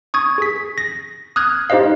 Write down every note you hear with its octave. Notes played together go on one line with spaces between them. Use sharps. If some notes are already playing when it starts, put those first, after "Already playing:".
C#6 D#6 G#6
G#4 B6
A#6
D#6 F6 F#6 G#6
D#4 G4 C5 D#5 F5